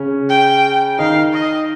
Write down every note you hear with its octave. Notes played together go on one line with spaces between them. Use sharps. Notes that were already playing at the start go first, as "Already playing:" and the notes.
Already playing: C#3 C#4
G5
D#3 D#4 F5
D#5